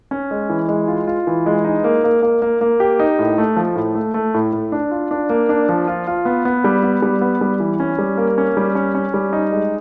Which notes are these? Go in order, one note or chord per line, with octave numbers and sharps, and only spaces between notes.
C#4
G#3
E3
G#3
F4
F4
E3
G#3
D#4
A#3
A#3
A#3
A#3
A#3
G4
D#4
A2
A3
F3
A2
A3
A3
A2
A2
D4
F4
D4
A#3
D4
F3
F4
F4
B3
B3
G3
B3
G3
B3
G3
E3
C#4
G3
A#3
C#4
G3
C#4
C#4
G3
D#4
G#3